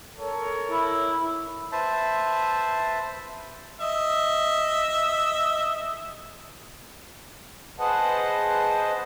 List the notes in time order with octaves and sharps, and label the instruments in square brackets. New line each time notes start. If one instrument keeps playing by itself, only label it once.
[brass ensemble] A4 A#4 C#5
[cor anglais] E4
[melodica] B4 C5 E5 A5
[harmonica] D#5 E5
[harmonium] G#4 B4 C5 D#5 F#5 A5